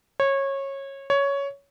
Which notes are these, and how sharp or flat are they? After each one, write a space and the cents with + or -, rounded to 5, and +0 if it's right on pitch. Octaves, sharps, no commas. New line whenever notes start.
C#5 -20
C#5 +10